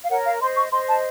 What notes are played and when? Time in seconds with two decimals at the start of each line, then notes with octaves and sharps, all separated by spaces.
0.04 F5
0.10 A#4 C#5 F#5
0.25 F5
0.41 C5 D#5 C6
0.56 C#6
0.72 C5 D#5 C6
0.88 A5